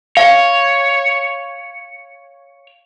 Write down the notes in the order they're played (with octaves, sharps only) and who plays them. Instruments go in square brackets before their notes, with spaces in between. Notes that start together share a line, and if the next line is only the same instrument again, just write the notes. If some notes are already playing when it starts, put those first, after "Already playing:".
[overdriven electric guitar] C#5 [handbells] F5